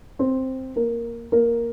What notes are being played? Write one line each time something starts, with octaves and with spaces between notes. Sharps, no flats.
C4 C5
A#3 A#4
A#3 A#4